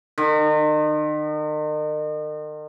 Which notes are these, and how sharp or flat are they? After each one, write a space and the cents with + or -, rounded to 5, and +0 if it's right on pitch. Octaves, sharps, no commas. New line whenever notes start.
D#3 -40